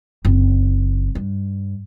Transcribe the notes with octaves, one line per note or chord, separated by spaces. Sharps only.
F#1 C4
G2